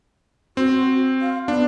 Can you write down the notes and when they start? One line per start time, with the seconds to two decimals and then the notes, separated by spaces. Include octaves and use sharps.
0.57 C4 F#4
1.21 F5
1.48 B3 D4